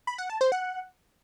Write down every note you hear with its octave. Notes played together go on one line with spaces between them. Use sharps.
B5
F#5
A5
C5
F#5